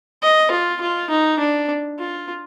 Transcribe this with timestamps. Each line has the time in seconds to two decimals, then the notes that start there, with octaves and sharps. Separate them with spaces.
0.23 D#5
0.51 F4
0.81 F4
1.10 D#4
1.39 D4
1.99 F4